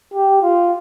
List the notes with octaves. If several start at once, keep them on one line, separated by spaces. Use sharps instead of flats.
G4
F4